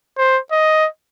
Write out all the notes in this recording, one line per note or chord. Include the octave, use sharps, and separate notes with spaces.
C5
D#5